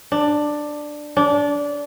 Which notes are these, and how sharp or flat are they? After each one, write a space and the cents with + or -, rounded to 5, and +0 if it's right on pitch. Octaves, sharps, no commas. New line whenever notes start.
D4 +10
D4 -20